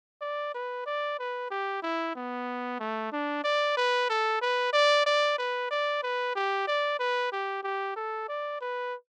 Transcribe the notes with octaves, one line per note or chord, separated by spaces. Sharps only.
D5
B4
D5
B4
G4
E4
B3
A3
D4
D5
B4
A4
B4
D5
D5
B4
D5
B4
G4
D5
B4
G4
G4
A4
D5
B4